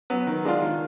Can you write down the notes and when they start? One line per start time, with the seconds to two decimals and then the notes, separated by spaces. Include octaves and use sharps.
0.10 F#3 B3
0.27 D#3
0.45 G#3 D4 F4
0.62 D#3